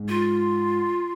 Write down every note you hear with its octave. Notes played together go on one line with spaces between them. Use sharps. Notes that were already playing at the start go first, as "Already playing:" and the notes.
Already playing: G#2
F4